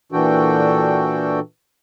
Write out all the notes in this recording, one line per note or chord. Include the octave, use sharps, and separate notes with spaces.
A#2 E3 D4 F#4 A4 G5